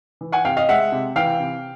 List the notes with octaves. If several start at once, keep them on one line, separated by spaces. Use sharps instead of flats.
E3
F#5 G#5
C3 F5 G5
D#5 F5
G#3 E5 F#5
C3
E3 F5 G5
C3